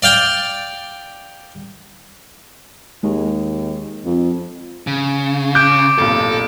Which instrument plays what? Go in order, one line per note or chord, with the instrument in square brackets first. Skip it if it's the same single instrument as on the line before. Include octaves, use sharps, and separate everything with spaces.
[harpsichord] D5 F5 G5
[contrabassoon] D#2 [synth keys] G#3
[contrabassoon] F2
[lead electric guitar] C#3
[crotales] D6 D7 [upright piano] G6
[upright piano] F1 B1 A#2 [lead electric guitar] A4